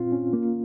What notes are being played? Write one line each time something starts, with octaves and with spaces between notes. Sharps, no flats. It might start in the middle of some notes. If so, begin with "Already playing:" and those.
Already playing: A#2 C4 F4
C#4
A#3